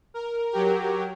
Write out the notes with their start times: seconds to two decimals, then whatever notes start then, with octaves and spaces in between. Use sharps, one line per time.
0.14 A#4
0.51 F#3 G4 A#4